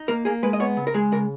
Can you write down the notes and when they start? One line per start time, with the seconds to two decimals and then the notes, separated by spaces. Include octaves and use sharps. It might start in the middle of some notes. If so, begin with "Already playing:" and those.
Already playing: D#4
0.08 A#3 A#4
0.25 A#3 G#4
0.43 G#3 B4
0.53 D#5
0.60 B3 C#5
0.77 C#3
0.87 A#4
0.94 G#3 G#4
1.12 C#3 A#4